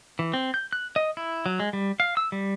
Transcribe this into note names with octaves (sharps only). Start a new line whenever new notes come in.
E3
C4
G6
F#6
D#5
E4
F#3
G#3
G3
F5
E6
G3